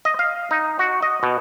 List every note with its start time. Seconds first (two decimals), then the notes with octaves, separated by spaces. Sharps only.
0.05 D#5
0.19 F5
0.51 D#4
0.79 F#4
1.02 D#5
1.23 B2